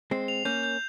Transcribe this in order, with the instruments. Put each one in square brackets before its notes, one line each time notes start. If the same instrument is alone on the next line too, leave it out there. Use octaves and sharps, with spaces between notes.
[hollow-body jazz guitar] G#3 C4 [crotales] C7
[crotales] F7
[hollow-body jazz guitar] A#3 C#4 [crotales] G6
[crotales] G6